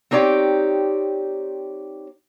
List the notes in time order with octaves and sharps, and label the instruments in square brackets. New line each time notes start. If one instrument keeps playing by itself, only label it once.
[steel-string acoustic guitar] C4 D#4 G4 C#5 D5